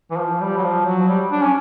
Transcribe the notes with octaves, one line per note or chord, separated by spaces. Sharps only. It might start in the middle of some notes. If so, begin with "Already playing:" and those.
E3
F3
G3
F#3
F3
F#3
G3
D4
C#4